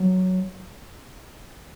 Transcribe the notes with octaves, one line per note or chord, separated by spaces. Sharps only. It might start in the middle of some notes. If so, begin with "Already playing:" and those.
Already playing: F#3